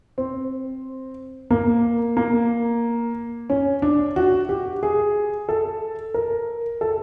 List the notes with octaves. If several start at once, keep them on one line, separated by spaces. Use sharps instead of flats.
C4
A#3
A#3
C#4
D4
F#4
G4
G#4
A4
A#4
A4